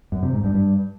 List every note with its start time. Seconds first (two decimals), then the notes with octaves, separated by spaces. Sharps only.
0.12 F#2
0.23 C3
0.33 G#2
0.44 G2
0.54 G2